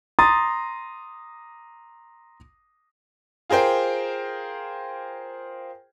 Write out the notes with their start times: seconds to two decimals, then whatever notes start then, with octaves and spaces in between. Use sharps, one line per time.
0.19 A#5 C6 D#6 A6
3.50 F4 G#4 A#4 C5 G5